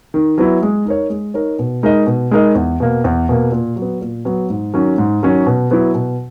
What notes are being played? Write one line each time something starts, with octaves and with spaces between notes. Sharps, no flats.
D#3
F#3 B3 E4
G#3
D#4 A#4 C#5
G#3
D#4 A#4 C#5
B2
G#3 D#4 A#4 D#5
B2
G#3 D#4 A#4 D#5
E2
B2 A#3
E2
B2 A#3
A#2
F#3
B3
A#2
F#3 B3
G#2
D#3 F#3 C#4
G#2
D#3 F#3 C#4
B2
F#3 B3 E4
B2